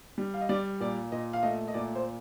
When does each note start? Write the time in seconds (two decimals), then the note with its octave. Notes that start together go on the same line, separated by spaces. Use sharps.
0.18 G3
0.34 F5
0.41 D#5
0.49 G3 D5
0.80 A#2 D5
1.12 A#2 D#5
1.33 F5
1.43 A3 D#5
1.68 D#5
1.74 A#2 D5
1.95 C5